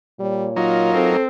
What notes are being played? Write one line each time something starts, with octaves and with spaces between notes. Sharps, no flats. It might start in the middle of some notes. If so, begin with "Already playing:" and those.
A#2 G3 C#5
F#3 D#4 F4 A#4
C4 A4